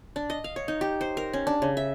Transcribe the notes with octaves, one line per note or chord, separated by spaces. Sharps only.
D4
D#5
F5
C#5
D#4
G4
C5
A#4
C#4
D4
C#3
E5